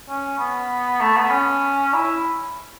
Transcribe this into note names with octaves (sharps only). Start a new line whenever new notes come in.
C#4
B3
A3
B3
C#4
E4